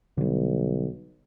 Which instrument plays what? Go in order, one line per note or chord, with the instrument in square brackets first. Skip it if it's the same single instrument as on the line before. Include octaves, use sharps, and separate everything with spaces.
[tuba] B1 [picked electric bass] D3 G3